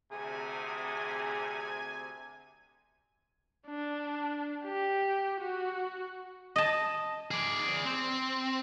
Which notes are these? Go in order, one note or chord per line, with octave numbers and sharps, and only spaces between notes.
D2 C3 G#4 G#5
D4
G4
F#4
D#5 A5
G#4 D5
C4